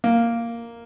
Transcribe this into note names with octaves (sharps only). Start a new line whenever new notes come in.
A#3